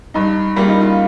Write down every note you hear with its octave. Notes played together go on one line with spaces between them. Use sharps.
G2 D#4
G3 A#3 F4
D#4
F4